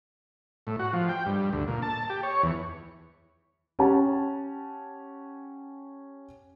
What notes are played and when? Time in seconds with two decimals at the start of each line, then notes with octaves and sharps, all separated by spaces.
0.67 A2
0.79 F#4
0.93 F3
1.09 G5
1.26 G2
1.53 D2
1.68 A#2
1.82 A5
2.10 G4
2.23 C#5
2.43 E2
3.79 C#4 G4 F#5 A5